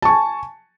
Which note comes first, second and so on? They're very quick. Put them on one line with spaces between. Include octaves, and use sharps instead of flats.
A5 C#6 G#5